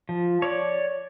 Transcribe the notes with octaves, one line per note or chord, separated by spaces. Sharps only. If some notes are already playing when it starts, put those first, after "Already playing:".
F3
C#5 D5